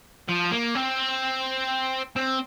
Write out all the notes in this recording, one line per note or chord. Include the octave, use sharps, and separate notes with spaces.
F3
A#3
C4
C4